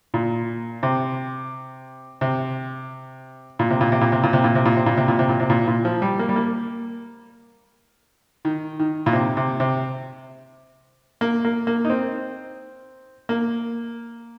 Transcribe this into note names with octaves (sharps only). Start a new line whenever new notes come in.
A#2
C3
C3
A#2
C3
A#2
C3
A#2
C3
A#2
C3
A#2
C3
A#2
C3
A#2
C3
A#2
C3
A#2
C3
A#2
A#2
F3
G3
A#3
G3
A#3
D#3
D#3
A#2
C3
C3
C3
A#3
A#3
A#3
D#4
C4
A#3